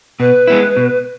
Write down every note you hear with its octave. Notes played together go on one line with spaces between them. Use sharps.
B2 B4
G#3 B3 E4
B2